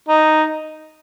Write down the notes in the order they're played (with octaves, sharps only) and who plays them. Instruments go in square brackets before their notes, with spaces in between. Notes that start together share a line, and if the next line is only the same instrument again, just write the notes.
[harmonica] D#4